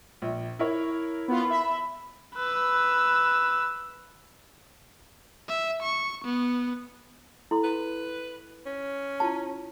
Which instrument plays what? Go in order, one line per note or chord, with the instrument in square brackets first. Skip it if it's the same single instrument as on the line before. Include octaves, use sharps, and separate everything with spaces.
[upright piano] A#1
E4 A#4 C#5
[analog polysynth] B3 F4 [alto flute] B5
[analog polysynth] E5
[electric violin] B4 E6
E5
C#6
B3
[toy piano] E4 A4 C6
[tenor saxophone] B4
C#4
[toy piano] E4 F4 A5